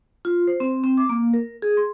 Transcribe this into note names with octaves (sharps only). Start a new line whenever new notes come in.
F4
C5
C4
C4
D6
A#3
A#4
G#4
C6